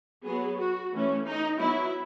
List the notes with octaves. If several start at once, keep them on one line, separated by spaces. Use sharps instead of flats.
F#3 B3 G#4
F#4
E3 A3 C#4
D#4
F#3 B3 E4